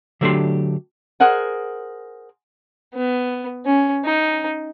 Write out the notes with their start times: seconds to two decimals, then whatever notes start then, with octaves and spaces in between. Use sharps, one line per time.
0.21 D3 F#3 A3 D4 G4 C6
1.20 G#4 A#4 C5 F#5 G#5
2.94 B3
3.66 C#4
4.04 D#4